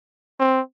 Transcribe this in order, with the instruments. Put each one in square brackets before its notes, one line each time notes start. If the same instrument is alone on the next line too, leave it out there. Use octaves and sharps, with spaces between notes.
[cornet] C4